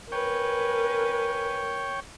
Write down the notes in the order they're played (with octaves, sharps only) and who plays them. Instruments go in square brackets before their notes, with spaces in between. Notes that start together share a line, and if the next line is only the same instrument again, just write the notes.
[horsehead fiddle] A#4 [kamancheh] B4 G#5 [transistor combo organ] C#5 G5